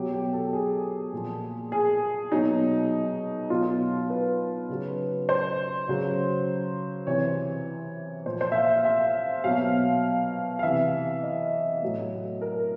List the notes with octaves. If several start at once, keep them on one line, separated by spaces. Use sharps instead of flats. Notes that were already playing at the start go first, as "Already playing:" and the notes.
Already playing: B2 F#3 G4
G4
A4
G#4
A#2 F3
G#4
B2 F#3 D#4
B2 F#3 F4
B4
C#3 F#3
C5
C#3 F#3
C3 E3 C#5
A#2 F3 C5
C5
E5
F5
E5
E5
B2 F#3 F5
F5
C3 E3 E5
D#5
A2 F#3
A#4